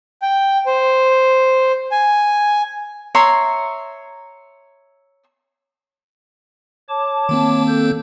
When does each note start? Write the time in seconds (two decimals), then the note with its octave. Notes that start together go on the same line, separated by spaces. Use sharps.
0.22 G5
0.66 C5
1.91 G#5
3.15 C#5 E5 A#5 C6
6.89 C#5 A5 D6
7.29 D#3 A#3 C4
7.67 A4 G6